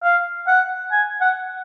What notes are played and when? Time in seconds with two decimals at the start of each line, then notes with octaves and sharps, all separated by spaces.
0.03 F5
0.47 F#5
0.92 G#5
1.21 F#5